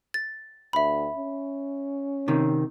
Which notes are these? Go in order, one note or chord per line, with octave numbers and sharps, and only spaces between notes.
A6
D2 E5 B5
C#4
C3 D#3